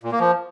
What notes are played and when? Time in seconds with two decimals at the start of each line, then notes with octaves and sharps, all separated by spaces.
0.03 A#2
0.12 A#3
0.20 F3